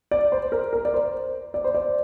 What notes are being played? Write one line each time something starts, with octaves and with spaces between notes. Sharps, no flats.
D5
C5
A#4
A#4
D5
C5
D5
C5
D5